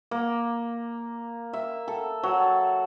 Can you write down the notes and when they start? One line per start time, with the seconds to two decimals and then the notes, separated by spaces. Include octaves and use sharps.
0.11 A#3
1.53 E5
1.88 A4
2.23 F#3
2.40 A5